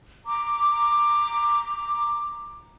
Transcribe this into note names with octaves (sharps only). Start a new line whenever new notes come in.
A#5 D6